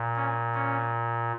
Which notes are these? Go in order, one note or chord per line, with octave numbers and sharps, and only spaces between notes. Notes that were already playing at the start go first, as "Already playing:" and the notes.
Already playing: A#2
C#4
C#4